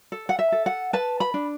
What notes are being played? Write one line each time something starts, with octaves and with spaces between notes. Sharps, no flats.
A4
F#5
E5
A4
F#5
B4 A5
B5
D4